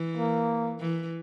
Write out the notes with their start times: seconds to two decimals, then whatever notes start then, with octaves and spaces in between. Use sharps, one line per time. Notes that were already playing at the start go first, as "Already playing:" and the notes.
Already playing: E3
0.17 A#3
0.80 E3